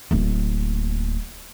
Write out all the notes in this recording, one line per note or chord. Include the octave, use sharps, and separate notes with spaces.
D1 A#3